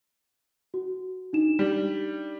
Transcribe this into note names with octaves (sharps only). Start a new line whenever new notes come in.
F#4
D4 D#4 E7
G3